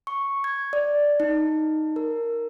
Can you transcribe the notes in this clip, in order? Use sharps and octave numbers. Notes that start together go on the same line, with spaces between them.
C#6
G#6
D5
D#4
A#4